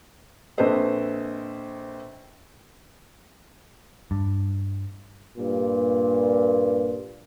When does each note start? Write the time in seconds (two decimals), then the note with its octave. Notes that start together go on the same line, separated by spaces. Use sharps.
0.58 A#1 C4 A4 B4 C5 D#5
4.11 G2
5.37 G2 A#2